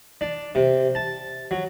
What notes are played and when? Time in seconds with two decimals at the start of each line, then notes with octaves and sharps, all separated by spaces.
0.21 D4
0.55 C3
0.95 A5
1.51 F#3